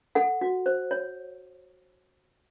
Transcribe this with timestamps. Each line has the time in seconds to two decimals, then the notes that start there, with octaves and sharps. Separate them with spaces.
0.15 A4 F#5
0.41 F#4
0.66 C5
0.91 C#5